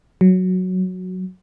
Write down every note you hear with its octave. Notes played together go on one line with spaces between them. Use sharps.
F#3